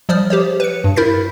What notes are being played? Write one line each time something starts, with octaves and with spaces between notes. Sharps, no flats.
F3 G3 C5 D5 D#6 F6
G4 C5 C#5
B4 C#7
G2
E4 A#4 G6 A6 B6